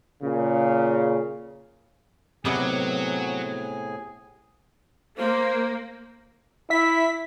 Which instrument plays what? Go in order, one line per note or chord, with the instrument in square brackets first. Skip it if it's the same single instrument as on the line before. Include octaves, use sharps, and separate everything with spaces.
[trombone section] A#2 C#3
[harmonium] A2 G#4 G#5 [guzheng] C3 B3 D#5 [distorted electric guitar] F#3
[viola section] A#3 [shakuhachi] C5
[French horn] E4 [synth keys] E5 B6